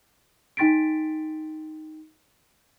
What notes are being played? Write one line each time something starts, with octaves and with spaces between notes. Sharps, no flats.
D#4 G5 C6 A6 B6 D7